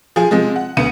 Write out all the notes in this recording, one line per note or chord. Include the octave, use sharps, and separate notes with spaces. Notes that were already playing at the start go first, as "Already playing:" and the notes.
F3 G#4
C3 F3 G#3
F#5
D2 B3 C#7 D#7